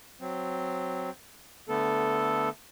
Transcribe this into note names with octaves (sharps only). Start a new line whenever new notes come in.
F#3 C4
D3 A3 B3 A4